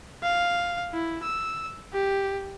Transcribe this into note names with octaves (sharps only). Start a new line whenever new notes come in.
F5
E4
E6
G4